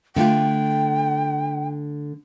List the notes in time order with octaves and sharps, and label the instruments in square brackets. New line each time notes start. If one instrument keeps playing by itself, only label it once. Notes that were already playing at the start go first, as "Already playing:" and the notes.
[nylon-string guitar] D3 A3 F4 [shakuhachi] G5